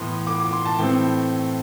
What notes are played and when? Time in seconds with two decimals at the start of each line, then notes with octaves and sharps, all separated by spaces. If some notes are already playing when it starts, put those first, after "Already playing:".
Already playing: A2 E3 B3 C6
0.27 D6
0.40 D6
0.53 C6
0.65 A5
0.78 A2 E3 A3 C4 G5